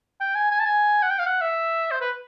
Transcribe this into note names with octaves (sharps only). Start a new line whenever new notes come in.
G5
G#5
G#5
A5
G#5
F#5
G5
F5
F#5
E5
C5
B4